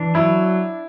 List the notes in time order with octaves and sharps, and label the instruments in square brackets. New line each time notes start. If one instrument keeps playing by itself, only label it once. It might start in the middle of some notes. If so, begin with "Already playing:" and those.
Already playing: [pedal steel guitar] E3 D4
[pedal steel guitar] F#3 [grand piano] E4